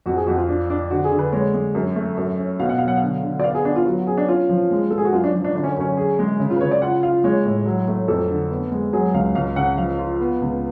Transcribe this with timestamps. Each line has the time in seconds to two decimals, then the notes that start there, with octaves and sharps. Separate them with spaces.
0.06 F2 F#4
0.17 G#4
0.27 F2 F#4
0.38 F4
0.49 D4
0.70 D4
0.90 D3 F#4
1.04 G#4
1.11 D3
1.19 B4
1.32 G#3 C#5
1.54 G#3
1.75 F#2
1.96 A3
2.17 F#2
2.38 C#4
2.59 B2 F5
2.69 F#5
2.78 F#3 F5
2.88 F#5
2.97 F5
3.02 D3
3.23 D3
3.40 D5
3.44 B3 F5
3.54 G#4
3.64 B3 D4
3.76 F4
3.86 F#3 F#4
4.07 C#4 G#4
4.18 D4
4.28 C#4 F4
4.49 F3
4.71 G#3
4.91 G#3 A4
4.98 G#4
5.05 F#4
5.12 F#2 F4
5.24 D4
5.34 F3
5.45 D4
5.55 D3 D4
5.64 C#4
5.77 F#2 C#4
5.97 G#4
6.19 G#3
6.40 C#3
6.50 F4
6.56 B4
6.61 C#3 C#5
6.71 D5
6.82 F4 F#5
7.03 F4 F5
7.24 G#3 C#5
7.46 A2
7.66 F#3
7.88 A3
8.08 F2 A4
8.30 D3
8.50 B3
8.72 G#3
8.93 F#3 G#4
9.14 C#2 F5
9.35 C#2 F5
9.56 C#3 F#5
9.78 F3 F5
9.99 F4
10.20 B3
10.41 C#2